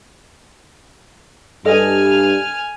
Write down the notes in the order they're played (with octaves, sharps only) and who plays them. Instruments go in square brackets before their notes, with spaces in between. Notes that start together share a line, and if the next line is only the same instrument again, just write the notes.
[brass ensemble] G2 [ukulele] A4 D#5 [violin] G#5 F6